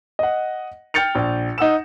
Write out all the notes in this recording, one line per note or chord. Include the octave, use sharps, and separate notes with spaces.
D#5 F#5
G5 F6 G6 A6 C#7 F7
A#1
D#4 F#5 E6 E7